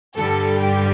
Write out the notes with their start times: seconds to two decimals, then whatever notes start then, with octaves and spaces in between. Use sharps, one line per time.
0.17 G2 D3 G3 A4
0.60 G4